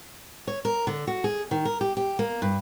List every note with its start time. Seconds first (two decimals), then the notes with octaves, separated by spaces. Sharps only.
0.47 C#5
0.65 A#4
0.87 D3
1.07 F#4
1.24 G#4
1.51 D#3
1.65 A#4
1.81 G4
1.97 G4
2.19 A#3
2.42 G2